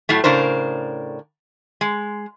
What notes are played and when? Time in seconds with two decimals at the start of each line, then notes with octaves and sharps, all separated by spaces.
0.09 A2 F#3 A3
0.24 A2 C#3 D4 A#4 C5
1.81 G#3